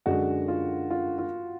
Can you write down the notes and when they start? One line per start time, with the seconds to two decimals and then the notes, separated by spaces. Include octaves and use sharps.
0.06 F#2 D3 G#3 D4 F#4
0.48 F4
0.90 F4
1.18 F4